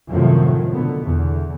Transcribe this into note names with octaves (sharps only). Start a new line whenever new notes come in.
F#2 A2 C3 D#3 F3 F#3
B2 D3 B3
E2 D3